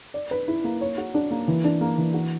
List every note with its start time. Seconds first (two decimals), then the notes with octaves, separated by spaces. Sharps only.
0.14 D5
0.31 B4
0.48 E4
0.64 A#3
0.81 C#5
0.98 F#4
1.14 D4
1.31 A#3
1.48 E3
1.64 D4
1.81 A#3
1.98 E3
2.14 F#4